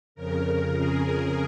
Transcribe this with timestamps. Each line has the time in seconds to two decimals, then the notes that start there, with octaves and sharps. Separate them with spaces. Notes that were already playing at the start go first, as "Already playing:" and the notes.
0.15 F2 C#3 A#4
0.76 G#4
1.06 A#4